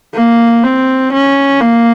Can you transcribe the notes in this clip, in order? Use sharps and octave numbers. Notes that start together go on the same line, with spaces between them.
A#3
C4
C#4
A#3